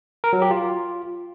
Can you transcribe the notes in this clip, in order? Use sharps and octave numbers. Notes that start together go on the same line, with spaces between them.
A#4
F#3
G4
F4